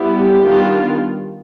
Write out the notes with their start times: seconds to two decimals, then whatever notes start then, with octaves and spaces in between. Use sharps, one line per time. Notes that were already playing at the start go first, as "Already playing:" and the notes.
Already playing: G3 B3 E4
0.14 G4
0.42 D#3 G3 B3 D4 F4